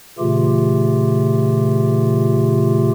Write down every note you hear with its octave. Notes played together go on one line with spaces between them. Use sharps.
A#2 C#3 E3 A3 F4 G4